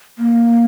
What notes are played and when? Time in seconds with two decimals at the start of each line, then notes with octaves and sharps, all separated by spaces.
0.19 A#3